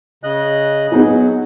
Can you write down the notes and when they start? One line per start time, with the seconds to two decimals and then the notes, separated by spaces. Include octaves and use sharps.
0.24 C#3 D#5 F#6
0.92 F#3 B3 D#4 G#4